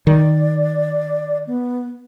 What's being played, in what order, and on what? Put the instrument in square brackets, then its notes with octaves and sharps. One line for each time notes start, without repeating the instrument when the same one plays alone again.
[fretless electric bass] D#3 [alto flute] D5
[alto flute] B3